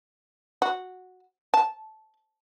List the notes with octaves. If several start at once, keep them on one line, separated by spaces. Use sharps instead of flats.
F#4
A5